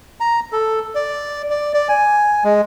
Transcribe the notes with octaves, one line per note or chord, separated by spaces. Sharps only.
A#5
A4
D5
D5
D5
G#5
G#3